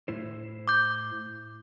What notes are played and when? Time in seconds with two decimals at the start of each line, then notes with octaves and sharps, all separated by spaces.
0.08 A2 E4 C5
0.68 D6 G6